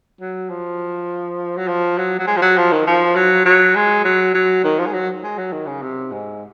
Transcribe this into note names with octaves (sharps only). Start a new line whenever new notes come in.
F#3
F3
F#3
F3
F#3
F#3
G#3
F3
F#3
F3
D#3
F3
F#3
F#3
G#3
F#3
F#3
D#3
F3
G#3
F#3
G#3
F#3
D#3
C#3
C3
G#2